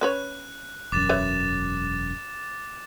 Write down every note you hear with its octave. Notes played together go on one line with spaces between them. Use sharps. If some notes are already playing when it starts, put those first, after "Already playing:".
C#4 B4 C#5 F#6
E1 F#2 D6 A6 E7
B4 C#5 E5